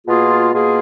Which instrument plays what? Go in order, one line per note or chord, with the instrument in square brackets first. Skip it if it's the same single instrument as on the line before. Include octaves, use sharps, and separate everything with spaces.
[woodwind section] B2 A#3 F4 G#4
B2 A#3 F4 G#4